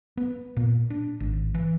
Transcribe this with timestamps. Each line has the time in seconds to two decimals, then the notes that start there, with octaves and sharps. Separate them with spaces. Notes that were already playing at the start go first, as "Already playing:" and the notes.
0.17 B3
0.57 A#2
0.90 D4
1.20 G#1
1.54 E3